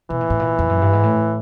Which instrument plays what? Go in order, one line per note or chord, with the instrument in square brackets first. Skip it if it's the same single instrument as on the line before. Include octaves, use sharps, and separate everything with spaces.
[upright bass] B2 [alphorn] E3
[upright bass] A#2
A2
A#2
F2
F#2
G2
G#2
A2